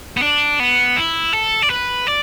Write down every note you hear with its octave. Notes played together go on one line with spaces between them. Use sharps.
B3
D4
B3
E4
A4
D5
B4
D5